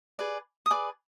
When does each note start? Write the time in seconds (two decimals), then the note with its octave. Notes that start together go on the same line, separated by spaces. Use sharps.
0.19 G#4 B4 D5
0.66 D#6
0.70 G#4 B4 D5 D6